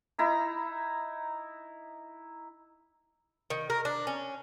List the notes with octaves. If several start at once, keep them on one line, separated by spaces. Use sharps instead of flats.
D#4 E4 A#5
D#3
A#4
D4
C#4